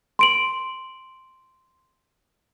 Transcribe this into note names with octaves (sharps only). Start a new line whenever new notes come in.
C6 D7 F#7